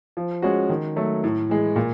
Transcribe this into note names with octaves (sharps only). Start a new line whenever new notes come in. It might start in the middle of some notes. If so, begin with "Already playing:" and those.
F3
G#3 C#4 F#4
D#3
F#3 A3
A2
E3 G#3
A#2